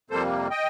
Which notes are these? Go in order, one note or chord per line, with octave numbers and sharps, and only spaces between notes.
F2 C3 G3 A#3 A4 C5
D#5 G5